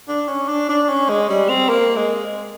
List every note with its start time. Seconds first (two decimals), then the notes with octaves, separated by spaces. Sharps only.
0.09 D4
0.28 C#4
0.49 D4
0.69 D4
0.89 C#4
1.09 G#3
1.29 G3
1.49 C4
1.69 A#3
1.96 G#3